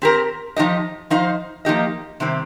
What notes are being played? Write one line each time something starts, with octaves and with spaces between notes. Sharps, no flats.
C4 G4 A#4
F3 D#4 G4 D#5
F3 D#4 C5 F5
F3 A#3 D#4 G4 D#5
C3 D#3 G3 C4